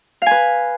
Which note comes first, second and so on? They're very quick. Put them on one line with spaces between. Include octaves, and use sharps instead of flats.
F5 G#5 B4